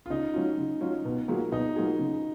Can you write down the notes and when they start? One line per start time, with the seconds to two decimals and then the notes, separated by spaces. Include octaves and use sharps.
0.06 F4
0.10 C#3 D#4
0.34 F#3 C#4 F4
0.58 C#3
0.81 F#3 C#4 F4
1.05 B2
1.28 F#3 A#3 F4 G#4
1.51 B2 D#4
1.76 F#3 A#3 F4 G#4
1.99 C#3